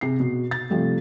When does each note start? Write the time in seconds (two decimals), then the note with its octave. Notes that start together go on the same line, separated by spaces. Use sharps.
0.01 C3 G#4 C7
0.20 B2
0.51 A6
0.70 C3 F3 G3 A3